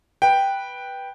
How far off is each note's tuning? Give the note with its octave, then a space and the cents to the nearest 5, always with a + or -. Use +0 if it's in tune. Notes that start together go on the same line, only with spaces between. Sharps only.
B4 -10 G5 +0